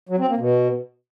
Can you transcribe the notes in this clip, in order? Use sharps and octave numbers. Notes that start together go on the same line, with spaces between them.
F#3
C4
A#3
B2